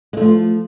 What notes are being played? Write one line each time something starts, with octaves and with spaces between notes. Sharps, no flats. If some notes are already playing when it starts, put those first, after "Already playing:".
F3 G#3 A3